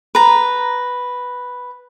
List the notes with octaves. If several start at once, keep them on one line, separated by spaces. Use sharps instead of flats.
B4 A#5